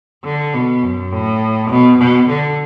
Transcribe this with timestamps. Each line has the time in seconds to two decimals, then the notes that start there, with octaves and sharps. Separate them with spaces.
0.24 D3
0.54 B2
0.83 F#2
1.12 A2
1.70 B2
1.98 B2
2.28 D3